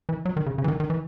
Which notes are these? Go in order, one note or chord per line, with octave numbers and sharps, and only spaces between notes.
E3
F#3
D#3
C#3
C#3
E3
D#3
D#3
E3